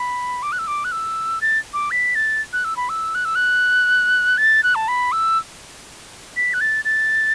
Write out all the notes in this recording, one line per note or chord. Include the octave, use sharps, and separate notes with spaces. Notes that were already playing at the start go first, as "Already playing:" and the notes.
Already playing: B5
D6
F#6
E6
D6
F#6
E6
A6
D6
B6
A6
F#6
E6
B5
E6
F#6
E6
F#6
A6
F#6
A5
B5
E6
B6
F#6
A6
A6